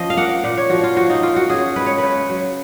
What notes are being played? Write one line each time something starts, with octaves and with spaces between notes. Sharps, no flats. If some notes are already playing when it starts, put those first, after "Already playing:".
Already playing: F3 C#4 C#5 D#5
F5
A#3 F#5
A#2
C#5
F3 F#4
F4
F3 F#4
D#4
A#3 F4
F#4
C#3 G#4
G#3 B4
C#5
C#3 B4
F#3